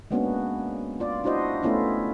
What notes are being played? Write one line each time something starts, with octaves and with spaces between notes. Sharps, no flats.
G#3 A#3 B3 C#4 D4 F#4
F4 D5
D4 E4 F#4 C5 D#5
A3 B3 C#4 E4 F4